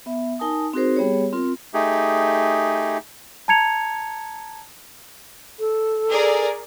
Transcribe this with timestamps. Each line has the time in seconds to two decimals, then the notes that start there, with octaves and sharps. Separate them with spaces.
0.06 B3 E5
0.39 D#4 A#4 G#5 A5 D#6
0.73 C4 D#4 F#4 G#4 A#4 C5
0.96 G3 B3 G4 G#4 C#5
1.33 C4 F4 A#4
1.74 A3 D#4 G4 G#4
3.48 A5 A#5 G#6 C#7 F7
5.60 A4
6.08 G#4 A#4 D5